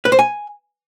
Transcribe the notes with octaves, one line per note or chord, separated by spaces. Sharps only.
B4
C5
G#5